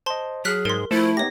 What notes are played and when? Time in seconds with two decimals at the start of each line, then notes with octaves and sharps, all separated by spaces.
0.06 C5 D#5 A5 C6
0.45 F#3 G#4 F6 F#6 B6
0.65 G#2 A#4 C6
0.91 F3 A3 E4 C5
1.17 B3 D#4 G4 C#5 A#6